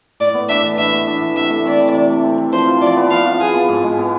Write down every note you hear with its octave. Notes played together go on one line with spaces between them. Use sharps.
A2 D5
B3
D4 E5
E3
A2 E5
B3
D4
E3
C3 E5
A3
C4 D5
E3
C3
A3
C4
E3
F3 C5
F4
F3 D5
B3
F3 F5
F4
F3 G#4
B3
G#2
G#3
B3